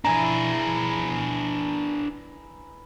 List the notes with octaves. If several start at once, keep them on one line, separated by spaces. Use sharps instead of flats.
E3 D4 E4 G#4 G#5 A#5